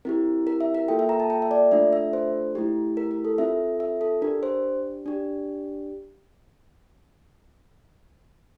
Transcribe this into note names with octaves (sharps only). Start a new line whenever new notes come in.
C4 E4 G4 A#4
A#4
E5
A#4
A#3 F4 A4 G5
E5
A#5
A5
G5
E5
D5
A3 D4 F4 A4 E5
E5
C5
A3 E4 G4
A#4
A#4
A4
C4 F4 A4 E5
E5
A4
D4 G4 A#4
C5
D4 G4